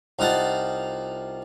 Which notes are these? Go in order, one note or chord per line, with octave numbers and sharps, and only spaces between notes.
C2 D#4 F4 F#5 A5